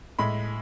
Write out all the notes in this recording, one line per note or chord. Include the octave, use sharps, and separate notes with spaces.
A2 G#3 B5